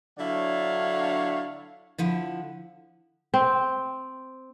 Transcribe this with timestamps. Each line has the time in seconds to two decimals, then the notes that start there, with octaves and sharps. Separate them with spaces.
0.17 D3 F#3 D4 E4 C#5 F5
1.98 D3 F3 E4
3.34 C4